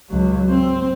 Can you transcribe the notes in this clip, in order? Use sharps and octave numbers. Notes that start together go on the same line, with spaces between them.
C#2 F#3
C4